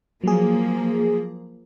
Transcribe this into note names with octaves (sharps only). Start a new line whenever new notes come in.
F3 F#3 A#3 G#4